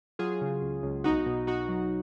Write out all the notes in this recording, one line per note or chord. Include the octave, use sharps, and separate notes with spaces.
F#3 F4 G#4
C#3
C#2
C#2
B1 D#4 F#4
B2
B2 D#4 F#4
F#3